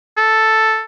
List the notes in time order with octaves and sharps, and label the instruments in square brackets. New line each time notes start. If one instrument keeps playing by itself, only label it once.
[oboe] A4